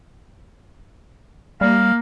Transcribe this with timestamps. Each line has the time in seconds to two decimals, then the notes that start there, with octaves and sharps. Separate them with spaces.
1.61 G3 A#3 F5